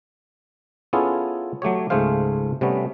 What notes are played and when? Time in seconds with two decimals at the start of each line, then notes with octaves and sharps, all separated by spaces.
0.93 B3 C#4 E4 F4 G#4 A4
1.62 F#3 A3 G4 C#5
1.90 C#2 G#2 A3 G#4 C5 F5
2.61 C3 G3 A3 B3 C#4